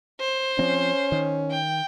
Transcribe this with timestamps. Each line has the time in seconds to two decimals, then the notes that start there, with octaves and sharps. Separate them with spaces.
0.20 C5
0.59 F3 C4 C#4
1.12 D#3
1.51 G5